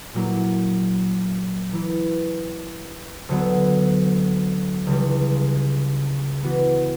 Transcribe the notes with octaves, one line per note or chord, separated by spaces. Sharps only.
A#2 F#3 A#3 E4
E3 A#3 E4 B4
D2 D3 F#3 B3
C#2 C#3 E3 G3
E3 B3 F#4 B4